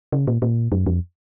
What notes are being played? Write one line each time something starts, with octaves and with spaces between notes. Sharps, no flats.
C#3
A#2
A#2
F#2
F2